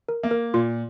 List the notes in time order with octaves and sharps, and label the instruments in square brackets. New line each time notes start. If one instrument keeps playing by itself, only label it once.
[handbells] A#4
[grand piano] A#3
[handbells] A#4
[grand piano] A#2 [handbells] F4